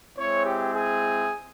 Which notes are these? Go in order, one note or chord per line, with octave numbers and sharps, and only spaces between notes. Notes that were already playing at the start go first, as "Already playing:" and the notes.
G#3 C4 E4 C#5
G4
G#4